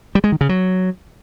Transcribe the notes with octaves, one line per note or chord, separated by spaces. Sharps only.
G3
G#3
D#3
C#3
F#3